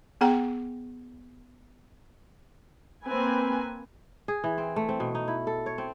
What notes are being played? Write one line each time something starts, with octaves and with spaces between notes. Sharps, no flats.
B3 G#4 F#5 G5 A#5
A#3 C4 B4 G#5
G#4
E3
C4
A3
C4
B2
D#4
E4
A4
C#5
C4